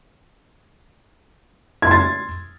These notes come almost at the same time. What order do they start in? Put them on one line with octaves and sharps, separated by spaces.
G#6 C6 A6